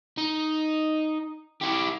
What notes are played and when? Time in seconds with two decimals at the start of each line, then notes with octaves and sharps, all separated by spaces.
0.17 D#4
1.62 E4 G4